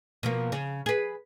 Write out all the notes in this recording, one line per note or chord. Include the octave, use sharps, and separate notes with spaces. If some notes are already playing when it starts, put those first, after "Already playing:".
B2 F3 A#3
C#3
G#4 B4